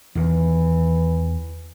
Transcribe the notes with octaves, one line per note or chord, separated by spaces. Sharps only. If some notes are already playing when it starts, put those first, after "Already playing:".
E2 D#3 E3